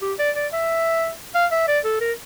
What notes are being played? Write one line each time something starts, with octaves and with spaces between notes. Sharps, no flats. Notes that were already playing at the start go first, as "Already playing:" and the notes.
G4
D5
D5
E5
F5
E5
D5
A4
A#4